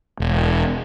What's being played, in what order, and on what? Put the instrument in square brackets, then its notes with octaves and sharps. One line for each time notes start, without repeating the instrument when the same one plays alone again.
[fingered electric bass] E1